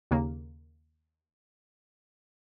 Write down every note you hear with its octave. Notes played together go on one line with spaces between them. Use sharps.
D#2 C#3 A#3